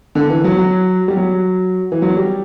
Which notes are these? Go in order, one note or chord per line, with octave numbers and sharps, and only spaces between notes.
D3
E3
F#3
F#3
G3
F#3
E3
F#3
G3